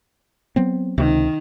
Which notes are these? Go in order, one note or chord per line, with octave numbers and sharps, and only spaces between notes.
F#3 B3 C4
C#2 C3 D#3